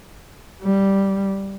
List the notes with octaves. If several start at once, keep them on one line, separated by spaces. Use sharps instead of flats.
G3